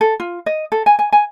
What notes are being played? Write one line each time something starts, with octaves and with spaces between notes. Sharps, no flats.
A4
F4
D#5
A4
G#5
G#5
G#5